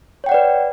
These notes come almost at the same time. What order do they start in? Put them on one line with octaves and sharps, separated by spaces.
C#5 G5 F#5 D5 B4